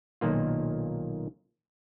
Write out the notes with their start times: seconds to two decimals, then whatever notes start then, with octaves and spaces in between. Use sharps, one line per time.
0.21 B1 A#2 D#3 A#3 F4